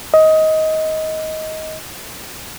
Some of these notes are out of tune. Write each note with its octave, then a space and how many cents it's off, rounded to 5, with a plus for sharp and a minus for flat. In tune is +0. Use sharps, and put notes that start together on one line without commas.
D#5 +20